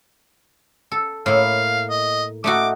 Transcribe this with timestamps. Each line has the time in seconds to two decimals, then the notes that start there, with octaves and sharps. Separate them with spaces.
0.92 A4
1.26 A2 A#3 F5
1.90 D#5
2.44 A3 D#4 F#4 D6